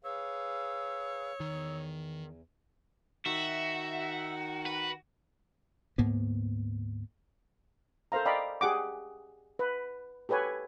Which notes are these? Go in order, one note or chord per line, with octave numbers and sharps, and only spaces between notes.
G#4 B4 C#5 F5 E6
E2 D#3
D#3 F#4 E5
B4
D2 G#2 A#3 B3
A4 A#4 C5 F5 A#5
D5 D#5 F5 G5 A#5 B5
G4 G#4 F#5 D6
B4
G4 A4 B4 C#5 G#5